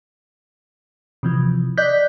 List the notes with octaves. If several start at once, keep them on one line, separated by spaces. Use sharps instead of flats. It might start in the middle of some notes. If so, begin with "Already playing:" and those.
C3 E3 F3
D5 D#5 F#6 G6 B6